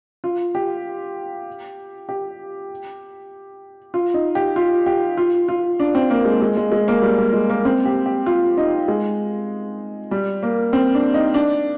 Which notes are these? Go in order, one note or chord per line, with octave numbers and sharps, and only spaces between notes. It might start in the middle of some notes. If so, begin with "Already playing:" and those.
F4
G4
G4
F4
D#4
G4
F4
G4
F4
F4
D4
C4
A#3
G#3
G#3
G#3
G#3
A#3
G3
G3
G#3
A#3
C4
G4
G4
F4
D#4
G#3
G3
A#3
C4
D4
D#4
D4